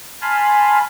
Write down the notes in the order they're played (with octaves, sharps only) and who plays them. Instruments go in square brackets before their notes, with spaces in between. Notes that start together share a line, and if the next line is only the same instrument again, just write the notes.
[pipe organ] G#5 A5 B5 C6 F6